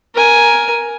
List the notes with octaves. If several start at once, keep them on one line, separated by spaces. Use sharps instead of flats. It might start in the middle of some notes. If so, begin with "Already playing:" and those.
A#4 G#5